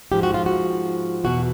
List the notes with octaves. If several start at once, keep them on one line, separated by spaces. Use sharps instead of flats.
G#2 F3 G4
F#4
F4
F#4
E2 B2 F#4